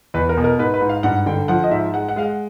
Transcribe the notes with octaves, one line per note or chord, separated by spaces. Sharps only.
E2 B4
A#4
B2
A#4
G#2 B4
B4
G#2
F5
G2 F#5
D3 G5
F3 F#5
D#5
G#2 E5
G#3 F#5
F#5
G#3 F5
F#5